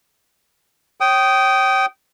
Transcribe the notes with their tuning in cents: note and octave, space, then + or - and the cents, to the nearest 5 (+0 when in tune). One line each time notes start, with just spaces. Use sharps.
C#5 -25 G5 -20 D#6 +0